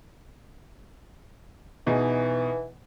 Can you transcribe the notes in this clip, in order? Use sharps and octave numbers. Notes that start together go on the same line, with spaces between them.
B2 E3 D#4 G#4